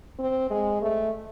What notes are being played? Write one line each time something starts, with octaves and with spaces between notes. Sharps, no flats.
C4
G#3
A3